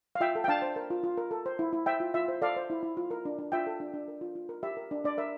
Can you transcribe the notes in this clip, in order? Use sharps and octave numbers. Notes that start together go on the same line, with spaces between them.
F5
F4 E5 G5
A4
G5
D4 F5 A5
C5
A#4
F4
F4
A#4
A4
C5
E4
E4
C5 E5 G5
F4
F4 E5
C5
A4 D5 F5
C5
E4
E4
F4
A#4
D4
D4
F4 E5 G5
A4
D4
D4
A#4
F4
F4
A#4
G4 E5
A#4
D4
D4 D5
A#4 E5